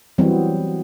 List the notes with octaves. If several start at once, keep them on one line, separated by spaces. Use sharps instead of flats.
E3 F#3 G3 B3 C4